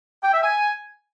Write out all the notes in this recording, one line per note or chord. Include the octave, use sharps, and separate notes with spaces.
G5
E5
G#5